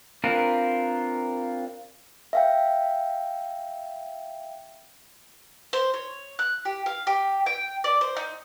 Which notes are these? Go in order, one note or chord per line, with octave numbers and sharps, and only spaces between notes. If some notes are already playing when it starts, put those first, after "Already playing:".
C4 D4 F4 A#4 B4
E5 F5 G5
C5
C#5
F#6
G4
F5
G4
G5
D5
C5
D#4